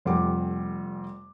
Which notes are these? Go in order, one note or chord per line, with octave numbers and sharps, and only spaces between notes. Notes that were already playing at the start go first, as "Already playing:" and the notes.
F1 F2 G3 F#5 D6